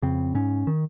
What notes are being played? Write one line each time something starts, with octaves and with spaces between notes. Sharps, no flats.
F2 C#3 C4
G#2 C#4
D#3